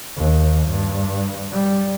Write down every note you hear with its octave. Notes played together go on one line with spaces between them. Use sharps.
D#2
G2
G3